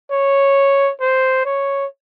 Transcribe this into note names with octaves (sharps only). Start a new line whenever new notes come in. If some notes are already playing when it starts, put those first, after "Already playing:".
C#5
C5
C#5